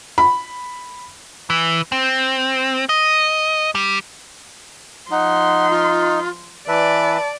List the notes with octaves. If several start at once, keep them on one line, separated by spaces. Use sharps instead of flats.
B5
E3
C4
D#5
G3
F3 D#4 F#5 C6
F4
E3 B4 D5 E5 A5